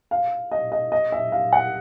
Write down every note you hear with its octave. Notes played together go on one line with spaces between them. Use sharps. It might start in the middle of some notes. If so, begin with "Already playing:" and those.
F5
D#5
D#5
D#5
E5
F5
F#5